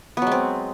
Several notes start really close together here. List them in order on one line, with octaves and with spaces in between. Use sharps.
B3 F#3 G#3 C4